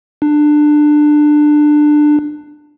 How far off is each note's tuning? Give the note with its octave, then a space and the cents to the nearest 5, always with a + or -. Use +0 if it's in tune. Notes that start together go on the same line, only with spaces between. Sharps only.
D4 +20